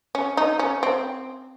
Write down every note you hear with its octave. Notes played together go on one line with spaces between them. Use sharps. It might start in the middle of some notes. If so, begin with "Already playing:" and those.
C#4
D#4
C#4
C4